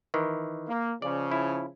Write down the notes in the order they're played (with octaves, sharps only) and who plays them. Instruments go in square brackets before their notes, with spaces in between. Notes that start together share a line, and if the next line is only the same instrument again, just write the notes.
[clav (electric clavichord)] D#3 E3
[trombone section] A#3
[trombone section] C#3 F3 [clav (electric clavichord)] D5
[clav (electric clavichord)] E4